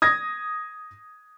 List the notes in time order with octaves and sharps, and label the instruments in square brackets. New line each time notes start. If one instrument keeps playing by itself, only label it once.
[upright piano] D#6 G#6 A#6